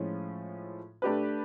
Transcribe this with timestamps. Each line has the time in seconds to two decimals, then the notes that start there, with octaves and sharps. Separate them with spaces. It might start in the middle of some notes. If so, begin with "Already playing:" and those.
Already playing: A2 F3 G#3 C#4 F4
1.02 A3 D4 G4 B4